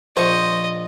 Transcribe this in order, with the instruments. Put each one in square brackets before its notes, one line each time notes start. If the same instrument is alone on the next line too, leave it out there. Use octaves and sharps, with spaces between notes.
[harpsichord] A#1 C#6 [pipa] C5 [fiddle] D#5